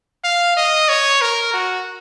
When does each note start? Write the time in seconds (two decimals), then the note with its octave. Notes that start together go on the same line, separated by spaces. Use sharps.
0.24 F5
0.57 D#5
0.89 C#5
1.21 A#4
1.54 F#4